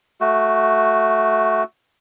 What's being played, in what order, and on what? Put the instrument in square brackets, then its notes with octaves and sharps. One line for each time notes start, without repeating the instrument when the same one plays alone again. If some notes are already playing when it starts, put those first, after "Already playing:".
[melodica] A3 F#4